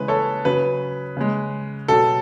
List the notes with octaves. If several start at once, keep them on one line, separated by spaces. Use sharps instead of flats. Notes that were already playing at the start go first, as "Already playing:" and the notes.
Already playing: C#3 E3 G#3 B4
A4 C#5
C#3 F#3 B4
C#3 G#3
B2 F#3 A4